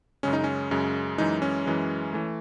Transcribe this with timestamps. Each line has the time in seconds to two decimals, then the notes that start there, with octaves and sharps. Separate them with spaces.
0.23 F#2 C#3 G#3 C#4
0.33 D#4
0.44 C#4
0.71 F#2 C#3 G#3
1.18 F#2 E3 G#3 D#4
1.42 C#4
1.66 F#2 E3 G#3
2.13 E3 A3